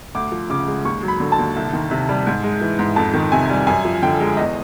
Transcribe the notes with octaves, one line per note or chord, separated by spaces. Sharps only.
D2 D6
F3
C#3 D6
G#3
D#2 C#6
F#3
B5
D3
A5
D#2
C2
D#3
C3
G3
G#2
G#3
E3
G#2
F2 A5
D#3
C3 G#5
G3
F#2 G#5
F3
D3 G5
G#3
E2 D#5